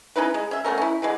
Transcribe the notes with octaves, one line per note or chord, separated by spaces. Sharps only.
C#4 D#4 E4 B4
G#3
C#4 E5
A3 B3 C#4 A#4
C#4 E4
D3 E3 G#3